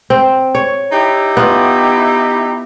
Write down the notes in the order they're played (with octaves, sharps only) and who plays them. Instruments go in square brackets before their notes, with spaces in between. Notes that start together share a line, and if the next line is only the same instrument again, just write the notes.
[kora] C4
C#5
[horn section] D#4 E4 G4
[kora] B3 F4